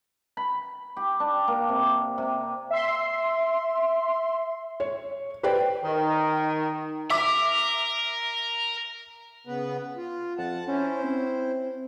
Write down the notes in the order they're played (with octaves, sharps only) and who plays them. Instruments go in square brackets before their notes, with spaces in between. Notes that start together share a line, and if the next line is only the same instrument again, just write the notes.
[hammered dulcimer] B5
G4
D4
A#3
C3
C3
[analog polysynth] E5 C6
[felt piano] C#5
G4 B4 C5 D5 G5
[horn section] D#3
[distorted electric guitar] A#4 [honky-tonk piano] E5 D6
[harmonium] C#3 B3 B4
F4
[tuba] F2 [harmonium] F#5 A5
[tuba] C#4 [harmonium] E4 C5
[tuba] C4